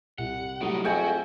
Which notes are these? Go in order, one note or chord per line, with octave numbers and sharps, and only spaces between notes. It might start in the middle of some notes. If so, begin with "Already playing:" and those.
C2 F#5
A2 F#3 G3 A3 D#4
F2 F#4 G#4 E5 G5 G#5